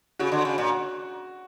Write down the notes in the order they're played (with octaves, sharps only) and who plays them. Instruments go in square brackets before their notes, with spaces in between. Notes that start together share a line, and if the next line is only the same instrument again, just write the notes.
[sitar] C#3 [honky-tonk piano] F#4
[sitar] D3
C#3
A#2